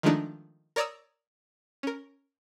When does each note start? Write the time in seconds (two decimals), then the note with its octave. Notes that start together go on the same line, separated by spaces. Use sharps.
0.03 D#3 F3 G#3 A3 D4 D#4
0.76 A#4 C#5 D5 A#5 D#6 E6
1.83 C#4 A#4